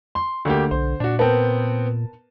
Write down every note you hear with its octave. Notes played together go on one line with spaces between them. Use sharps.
C6
D2 D3 A#3 G4
B1 C5
A#2 D4 F#4
B3 C4 A#4 B4 A5